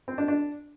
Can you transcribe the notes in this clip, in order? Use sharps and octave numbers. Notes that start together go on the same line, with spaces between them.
C4
D4
D4